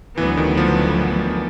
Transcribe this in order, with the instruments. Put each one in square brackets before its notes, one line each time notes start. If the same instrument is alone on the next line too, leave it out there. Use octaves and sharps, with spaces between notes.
[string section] D2 D3 F#3 B3 [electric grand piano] E3
[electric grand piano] D#3
F3